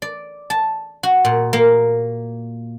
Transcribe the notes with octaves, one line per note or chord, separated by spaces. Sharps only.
D5
A5
F#4
A#2
A#3